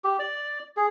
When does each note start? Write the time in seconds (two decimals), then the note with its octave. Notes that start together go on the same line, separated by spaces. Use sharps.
0.04 G4
0.19 D5
0.77 G#4